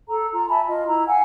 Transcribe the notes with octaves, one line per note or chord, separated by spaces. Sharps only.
A4 A#5
F4 A#5
E5 G#5 A5 B5
F4 D#5
E4 A#5
F5 F#5 G#5